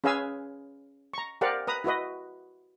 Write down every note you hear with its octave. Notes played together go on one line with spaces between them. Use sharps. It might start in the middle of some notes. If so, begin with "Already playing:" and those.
C#4 G#4 B4 F5 G#5 E6
A#5 C#6
G4 A#4 C5 D5 F5 F#5
B4 A#5 D#6
E4 F#4 B4 D#5